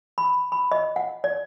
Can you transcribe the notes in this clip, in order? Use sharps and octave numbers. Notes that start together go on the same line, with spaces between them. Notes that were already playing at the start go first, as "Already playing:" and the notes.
B5
B5
D#5
F#5
D5